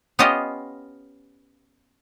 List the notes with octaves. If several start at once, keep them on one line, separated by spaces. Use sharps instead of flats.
B3 C#4 F4 G4 D#5